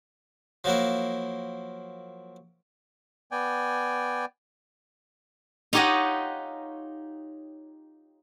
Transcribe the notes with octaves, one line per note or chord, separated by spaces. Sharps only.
F3 F#3 A#3 E4
B3 D5 G5 G#5
D#4 F4 G4 C#5 D#5 F#5